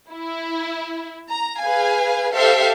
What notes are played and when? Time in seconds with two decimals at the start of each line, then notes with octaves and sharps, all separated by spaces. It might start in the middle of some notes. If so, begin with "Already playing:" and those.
0.10 E4
1.28 A#5
1.61 G#4 B4 F5 G#5
2.35 G4 A4 C5 E5 F5